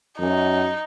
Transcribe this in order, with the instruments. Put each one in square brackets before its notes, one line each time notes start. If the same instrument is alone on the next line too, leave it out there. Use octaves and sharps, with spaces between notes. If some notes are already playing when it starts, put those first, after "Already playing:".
[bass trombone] F#2 [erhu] D#4